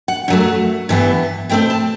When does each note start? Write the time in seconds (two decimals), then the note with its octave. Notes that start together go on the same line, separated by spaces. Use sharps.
0.08 F#5
0.28 F#2 F#3 A3 F#5
0.89 G2 E3 B3
1.49 B2 A3 C4 G5
1.70 A5